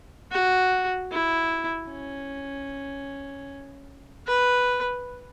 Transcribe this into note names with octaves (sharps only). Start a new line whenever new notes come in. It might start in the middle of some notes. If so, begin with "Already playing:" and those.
F#4
E4
C#4
B4